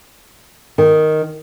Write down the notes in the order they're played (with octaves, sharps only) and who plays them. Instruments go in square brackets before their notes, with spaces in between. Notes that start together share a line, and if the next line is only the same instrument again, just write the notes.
[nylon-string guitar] D#3